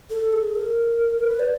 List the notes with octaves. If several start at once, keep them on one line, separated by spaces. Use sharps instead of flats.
A4
G#4
A#4
B4
D5